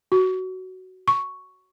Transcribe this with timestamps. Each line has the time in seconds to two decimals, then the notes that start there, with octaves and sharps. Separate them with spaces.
0.12 F#4
1.08 C#6